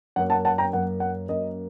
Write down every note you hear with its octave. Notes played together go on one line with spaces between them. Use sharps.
F#2 F#3 A#3 F#5
F#5 A5
F#5 A5
G5 A#5
F#2 F#3 A#3 F#5
F#5
F#2 F#3 A#3 D#5